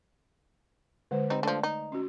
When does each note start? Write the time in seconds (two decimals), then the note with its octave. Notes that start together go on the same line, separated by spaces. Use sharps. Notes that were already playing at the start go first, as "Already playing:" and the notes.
1.11 D3 G#3 C5
1.30 G3 C4 D#4
1.43 D3 F3 A3 D5
1.63 D#4
1.92 C#4 F#4